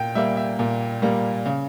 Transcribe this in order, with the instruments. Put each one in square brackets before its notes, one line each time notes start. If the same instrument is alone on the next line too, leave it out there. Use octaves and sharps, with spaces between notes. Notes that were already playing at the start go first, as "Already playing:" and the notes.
Already playing: [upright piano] A#2 G5
G3 A#3 E5
E5
A#2
G3 A#3
C#3